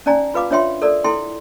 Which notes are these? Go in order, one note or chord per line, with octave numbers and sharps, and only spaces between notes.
C#4 D#4 D5 G#5 A#5
F4 B4 F5 D6
D4 F4 C#5 E5 G5 C6
A4 A#4 D5
E4 A4 G5 C6